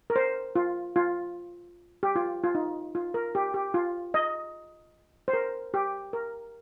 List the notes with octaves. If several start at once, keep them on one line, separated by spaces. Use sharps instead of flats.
A#4
C5
F4
F4
G4
F4
F4
D#4
F4
A#4
G4
G4
F4
D#5
C5
A#4
G4
A#4